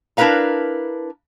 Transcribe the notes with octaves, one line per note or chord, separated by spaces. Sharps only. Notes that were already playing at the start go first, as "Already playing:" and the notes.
D4 E4 A#4 B4 F5 A#5